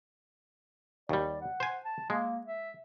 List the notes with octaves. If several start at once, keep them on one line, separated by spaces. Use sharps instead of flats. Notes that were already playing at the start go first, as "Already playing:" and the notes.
D#2 G3 D5
F#5
C5 G#5
A5
G#3 A#3
E5